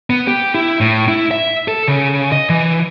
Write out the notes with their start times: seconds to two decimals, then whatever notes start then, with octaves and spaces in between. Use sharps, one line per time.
0.10 B3
0.27 G4
0.55 E4
0.81 A2
1.08 E4
1.31 E5
1.68 A4
1.88 C#3
2.32 D#5
2.50 E3